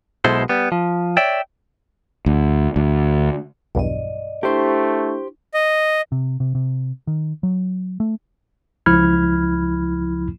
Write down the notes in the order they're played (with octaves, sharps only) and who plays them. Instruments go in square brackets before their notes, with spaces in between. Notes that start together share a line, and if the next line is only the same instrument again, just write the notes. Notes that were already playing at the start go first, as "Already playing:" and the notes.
[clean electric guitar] B1 B2 G#3 E4 A4 C5
G3 B3
F3
C#5 D5 E5 G5
[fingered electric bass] D2
D2
[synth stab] B1 E2 G2 [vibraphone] D5 D#5
[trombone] A3 [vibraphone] D4 E4 C#6 [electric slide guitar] G4 C5
[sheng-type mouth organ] D#5
[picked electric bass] C3
C3
C3
D#3
F#3
A3
[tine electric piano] C#2 F3 E4 B5 F6 G#6